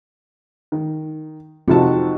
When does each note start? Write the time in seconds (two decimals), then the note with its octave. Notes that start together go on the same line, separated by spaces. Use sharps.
0.72 D#3
1.68 F2 C3 C4 D#4 F#4 A5